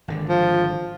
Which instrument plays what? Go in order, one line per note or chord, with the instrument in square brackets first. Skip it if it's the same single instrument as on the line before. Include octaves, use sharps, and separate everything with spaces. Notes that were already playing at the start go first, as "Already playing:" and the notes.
[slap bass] G#1 D3
[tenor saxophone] F3